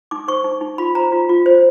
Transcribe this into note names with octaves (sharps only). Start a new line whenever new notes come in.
D#4 D6
C5 C#6
D#4
D#4
F4 B5
C5 A#5
F4
F4
C5